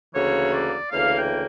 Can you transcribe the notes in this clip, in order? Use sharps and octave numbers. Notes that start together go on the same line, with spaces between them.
D2 C#3 E3 A#3 C#5
D5
D2 C#3 E3 A#3 F5
G5